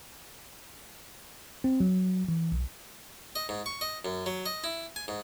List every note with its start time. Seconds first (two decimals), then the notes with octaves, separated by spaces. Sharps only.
1.64 C4
1.80 F#3
2.28 E3
2.52 B1
3.35 D#5
3.49 G#2
3.66 C#6
3.81 D#5
4.05 F#2
4.26 F#3
4.46 D#5
4.64 E4
4.96 G#5
5.08 G#2